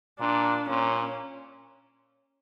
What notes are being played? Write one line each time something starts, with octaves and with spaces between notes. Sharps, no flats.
A#2 D4
A#2 C#4